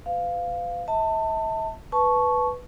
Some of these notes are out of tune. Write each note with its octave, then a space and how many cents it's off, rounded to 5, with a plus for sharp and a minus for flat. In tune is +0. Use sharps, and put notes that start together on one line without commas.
B4 +35 F5 +0
E5 -40 A5 +25
B4 +0 A5 -20 C#6 +0